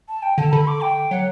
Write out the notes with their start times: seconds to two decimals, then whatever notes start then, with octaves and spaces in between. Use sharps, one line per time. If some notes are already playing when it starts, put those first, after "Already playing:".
0.08 A5
0.22 G5
0.37 D3 A5
0.52 D3 B5
0.67 D6
0.81 G5
1.11 F#3 F#5